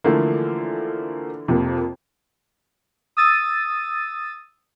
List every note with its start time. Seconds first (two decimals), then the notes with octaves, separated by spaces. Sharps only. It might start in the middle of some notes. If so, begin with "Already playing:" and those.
0.04 D3 E3 F3 A3 A#3
1.48 F2 C3 A#3
3.17 D#6 E6 A6 D#7